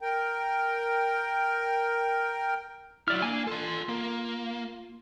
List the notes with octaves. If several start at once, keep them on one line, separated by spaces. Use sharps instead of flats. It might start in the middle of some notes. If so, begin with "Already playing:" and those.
A#4 G5
F#3 E4 F4 D5 F6
A#3 D4 G#5
F4 A4 C6
A#3